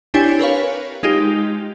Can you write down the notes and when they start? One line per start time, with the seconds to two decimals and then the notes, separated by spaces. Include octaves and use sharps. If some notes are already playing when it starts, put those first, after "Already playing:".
0.14 C4 D4 E4 G4 C#5 G#5
0.39 A#4 B4 C#5 F5
1.03 G#3 D#4 F4 G4